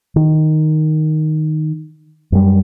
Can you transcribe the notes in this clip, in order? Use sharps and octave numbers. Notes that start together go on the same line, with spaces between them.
D#3
F#2 G3